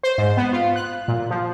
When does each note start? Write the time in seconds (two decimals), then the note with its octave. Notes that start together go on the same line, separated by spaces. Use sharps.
0.03 C5
0.18 G#2
0.37 B3
0.53 F4
0.76 F#6
1.08 A#2
1.30 F3